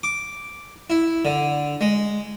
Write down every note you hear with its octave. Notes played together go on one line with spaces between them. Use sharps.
D6
E4
D3
G#3